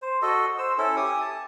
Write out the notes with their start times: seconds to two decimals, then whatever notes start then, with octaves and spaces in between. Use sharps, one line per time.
0.02 C5
0.22 F#4 A4 D#5
0.58 C5 E6
0.78 C#4 E4 A4
0.96 G4 G#5 D#6
1.21 A5